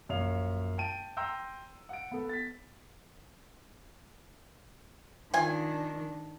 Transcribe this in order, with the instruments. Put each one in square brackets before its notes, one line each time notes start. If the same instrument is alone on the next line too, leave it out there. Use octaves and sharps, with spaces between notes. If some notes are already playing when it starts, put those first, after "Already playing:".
[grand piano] A#1 F#2 C#5 F5 F7
G5 A5 D7 D#7
G5 A#5 C6 E6 G6
F#5 D7
B3 A4
A6 B6
[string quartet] D#3 D4 [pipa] F4 G#5